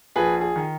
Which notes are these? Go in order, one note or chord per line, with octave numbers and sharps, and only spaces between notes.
A#1 G#4 B4
G#4
D#3